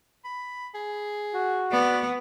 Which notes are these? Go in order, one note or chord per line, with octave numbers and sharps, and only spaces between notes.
B5
G#4
F#4
B3 D5